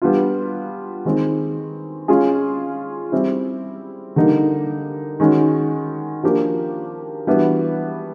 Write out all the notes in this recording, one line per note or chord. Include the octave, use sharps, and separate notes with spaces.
G3 B3 D4 F4
D#3 G#3 C4
G#3 C#4 F4 G#4
G3 C4 E4
D3 G3 A#3 D#4
D#3 G#3 C#4 F#4
F3 A#3 D4 G4
E3 G3 B3 D4 F#4